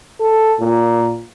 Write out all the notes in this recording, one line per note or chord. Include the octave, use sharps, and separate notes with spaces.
A4
A#2